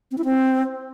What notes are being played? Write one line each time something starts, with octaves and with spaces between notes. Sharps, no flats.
C4
E4
C4